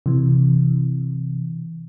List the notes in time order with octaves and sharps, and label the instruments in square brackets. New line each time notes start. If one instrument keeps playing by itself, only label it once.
[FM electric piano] C3 E3